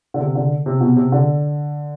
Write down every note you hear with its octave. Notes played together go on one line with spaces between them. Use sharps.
D3
C3
D3
C3
B2
C3
D3